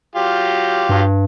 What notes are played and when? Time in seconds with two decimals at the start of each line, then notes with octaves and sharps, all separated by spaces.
0.15 F#3 F4 G4
0.89 G2